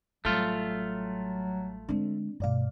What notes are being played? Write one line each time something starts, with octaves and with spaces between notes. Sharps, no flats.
A1 F#3 G3 A3 F4
D3 G#3 C4 D4
D2 G2 B2 D5 F5